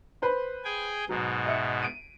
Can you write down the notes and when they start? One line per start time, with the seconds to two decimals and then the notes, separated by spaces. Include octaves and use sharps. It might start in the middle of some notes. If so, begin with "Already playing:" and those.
0.22 B4 C5 B5
0.65 G#4 G5 G#5
1.09 G#2 B2 F#3
1.46 D#5 E5 C#7
1.82 D7 D#7